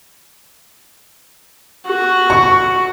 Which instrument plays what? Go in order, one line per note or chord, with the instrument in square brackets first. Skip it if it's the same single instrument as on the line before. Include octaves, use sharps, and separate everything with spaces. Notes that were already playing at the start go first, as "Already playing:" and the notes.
[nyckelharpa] F#4
[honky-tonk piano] C#6